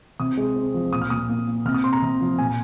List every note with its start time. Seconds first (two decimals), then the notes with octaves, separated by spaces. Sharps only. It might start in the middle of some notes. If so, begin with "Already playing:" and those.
0.19 C3 D#6
0.37 G#3
0.56 C4
0.74 F3
0.93 A#2 D#6
1.02 F6
1.10 A#2 D#6
1.29 A#3
1.47 A#3
1.65 C3 F6
1.74 D#6
1.84 C4 C6
1.93 A#5
2.02 C3
2.21 F3
2.39 A#2 G#5